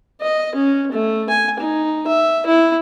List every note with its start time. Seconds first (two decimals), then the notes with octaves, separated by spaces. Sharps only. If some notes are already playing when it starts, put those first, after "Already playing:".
0.22 D#5
0.55 C#4
0.92 A3
1.30 G#5
1.59 D#4
2.07 E5
2.46 E4